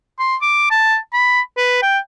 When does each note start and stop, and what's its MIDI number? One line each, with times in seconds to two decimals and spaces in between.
0.19 0.36 84
0.42 0.66 86
0.71 0.97 81
1.14 1.41 83
1.57 1.80 71
1.82 1.98 79